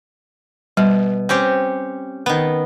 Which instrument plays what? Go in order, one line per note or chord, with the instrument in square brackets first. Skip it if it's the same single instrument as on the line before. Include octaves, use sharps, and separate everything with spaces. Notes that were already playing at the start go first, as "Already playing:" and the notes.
[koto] B2 [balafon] G3
[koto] C4 C#4 G4
D#3 B3